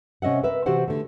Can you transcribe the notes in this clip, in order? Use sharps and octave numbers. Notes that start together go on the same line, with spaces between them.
C3 C#4 D#5 E5 F#5
A#4 B4 E5
C3 E3 F#4 G4 C5 F#5
D3 A3